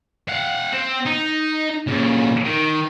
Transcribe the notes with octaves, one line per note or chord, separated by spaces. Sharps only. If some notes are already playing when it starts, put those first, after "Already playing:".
F5 F#5
C4
D#4
A#2 C#3
D#3